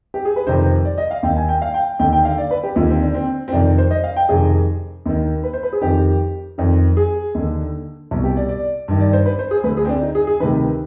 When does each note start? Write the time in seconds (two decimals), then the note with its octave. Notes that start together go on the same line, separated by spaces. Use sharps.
0.14 G4
0.25 G#4
0.36 B4
0.47 F2 C3 D#3 C5
0.85 D5
0.98 D#5
1.11 F5
1.23 D#2 D#3 G5
1.36 G#5
1.49 G5
1.62 F5
1.74 G5
1.99 D#2 D3 G5
2.13 G5
2.25 F5
2.38 D5
2.51 B4
2.64 G4
2.76 D#2 F4
2.79 D3
2.89 C4
3.02 D4
3.14 C4
3.48 C4
3.52 F2 C3 D#3 D4
3.78 C5
3.91 D#5
4.04 F5
4.16 G5
4.29 F2 C3 D#3 G#4
5.06 D#2 D#3
5.43 B4
5.53 C5
5.63 B4
5.73 G#4
5.82 F2 D#3 G4
6.58 F2 D#3
6.97 G#4
7.35 D#2 D3
8.11 C2 B2
8.24 G4
8.37 D5
8.49 D5
8.88 G2 D#3
9.00 D5
9.13 C5
9.26 B4
9.39 C5
9.51 G#4
9.64 D2 B4
9.67 D3
9.77 G#4
9.85 C4
9.89 D4
10.02 D#4
10.15 G#4
10.27 G#4
10.40 D2 C3 D#3 B4